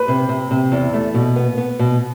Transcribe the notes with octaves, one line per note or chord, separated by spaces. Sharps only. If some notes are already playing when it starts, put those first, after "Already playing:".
Already playing: B4
C3
C3
C3
E2
A3
B2
B3
B3
B2